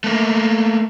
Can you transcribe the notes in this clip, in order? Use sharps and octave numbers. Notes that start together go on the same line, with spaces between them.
A3 A#3